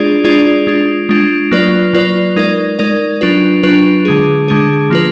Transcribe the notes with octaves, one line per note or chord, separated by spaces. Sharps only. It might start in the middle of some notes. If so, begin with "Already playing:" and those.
Already playing: G#3 D4 F4 G#4 D5
G#3 D4 F4 G#4 D5
G#3 D4 F4
G#3 D4 F4
F#3 A#3 F4 B4 D5
F#3 A#3 F4 B4 D5
G#3 D#4 A#4 D5
G#3 D#4 A#4 D5
F#3 D4 F4 B4
F#3 D4 F4 B4
D3 G#3 D4 G#4
D3 G#3 D4 G#4
F3 A#3 F4 B4